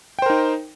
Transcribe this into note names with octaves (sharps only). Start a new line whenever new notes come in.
D#4 A#4 C5 G5